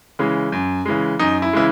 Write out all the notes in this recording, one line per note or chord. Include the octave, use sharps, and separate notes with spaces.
C#3 E3 G#3
F#2
C#3 E3 G#3
F#2 D#4
E4
C#3 E3 G#3 E4